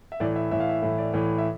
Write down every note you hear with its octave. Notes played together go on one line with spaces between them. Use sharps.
E5
A2 E3 D5
E5
A2 E3 E5
F5
E5
A2 E3
D5
A2 E3
E5